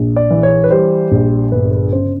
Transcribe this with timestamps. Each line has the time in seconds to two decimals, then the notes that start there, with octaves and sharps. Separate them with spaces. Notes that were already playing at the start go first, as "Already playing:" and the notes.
Already playing: A#1
0.16 D5
0.30 E3
0.43 C#5
0.64 B4
0.71 G3 C5
1.12 A#1
1.52 G1 B4
1.72 B4
1.93 C#3 C5